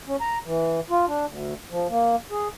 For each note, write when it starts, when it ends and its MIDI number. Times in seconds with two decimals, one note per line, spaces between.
0.07 0.16 61
0.21 0.38 82
0.45 0.80 52
0.90 1.05 65
1.08 1.26 62
1.26 1.53 38
1.70 1.87 53
1.89 2.16 58
2.31 2.48 68